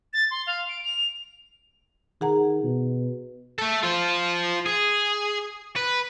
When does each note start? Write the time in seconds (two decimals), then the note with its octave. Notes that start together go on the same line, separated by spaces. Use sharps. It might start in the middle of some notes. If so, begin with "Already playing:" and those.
0.13 A6
0.31 C6
0.47 F5
0.69 D7
0.85 F7
2.21 D#3 G#4 F#5 A#5
2.63 B2
3.59 A3 A4
3.83 F4 C5
4.66 G#4
5.76 B4